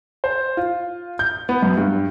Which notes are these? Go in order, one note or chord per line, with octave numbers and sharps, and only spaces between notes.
C5
F4
G6
B3
F#2
G2